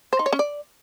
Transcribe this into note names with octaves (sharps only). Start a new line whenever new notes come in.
C5
D#4
C#5
C#4
D5